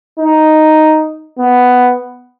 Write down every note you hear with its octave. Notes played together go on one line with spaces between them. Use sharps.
D#4
B3